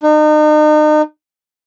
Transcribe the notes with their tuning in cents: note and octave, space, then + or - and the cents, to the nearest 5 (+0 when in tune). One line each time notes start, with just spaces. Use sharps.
D#4 -40